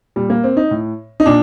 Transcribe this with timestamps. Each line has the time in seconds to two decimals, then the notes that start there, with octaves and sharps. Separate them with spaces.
0.16 A#2 G3
0.30 A#3
0.44 C4
0.57 D#4
0.71 A2
1.20 D#4
1.26 A#2 D4